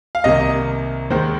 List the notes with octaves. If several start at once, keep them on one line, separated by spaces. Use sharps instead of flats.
F5
C2 C3 D#3 A#3 D#5
D#2 D#3 G#3 C5